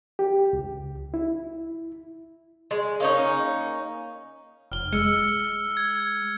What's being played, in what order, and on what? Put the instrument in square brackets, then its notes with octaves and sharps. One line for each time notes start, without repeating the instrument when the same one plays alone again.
[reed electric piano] G4
C#2
E4
[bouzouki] G#3
A#3 C#4 D#4
[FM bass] F1 [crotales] F6 G7
[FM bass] G#3 [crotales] E6 F6 C#7
[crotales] G#6